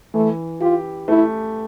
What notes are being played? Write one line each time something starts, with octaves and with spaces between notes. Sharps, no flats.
E3 A3
F4 G4
A3 E4